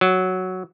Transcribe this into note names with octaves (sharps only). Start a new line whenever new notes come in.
F#3